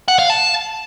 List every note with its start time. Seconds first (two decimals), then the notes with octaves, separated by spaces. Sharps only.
0.08 F#5
0.19 F5
0.30 A5